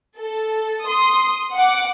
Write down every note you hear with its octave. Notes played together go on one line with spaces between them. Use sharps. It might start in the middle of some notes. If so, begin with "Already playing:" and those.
A4
C6 D#6
F#5 D6